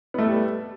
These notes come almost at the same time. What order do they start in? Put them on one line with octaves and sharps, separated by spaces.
B3 A3 A4 G3